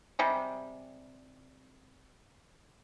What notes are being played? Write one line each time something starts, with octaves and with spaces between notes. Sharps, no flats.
C3 G3 G#3